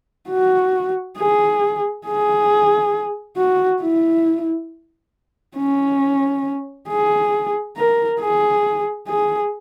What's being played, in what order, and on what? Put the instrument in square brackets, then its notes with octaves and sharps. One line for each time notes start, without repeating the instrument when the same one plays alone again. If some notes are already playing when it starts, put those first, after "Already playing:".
[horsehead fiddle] F#4
G#4
G#4
F#4
E4
C#4
G#4
A#4
G#4
G#4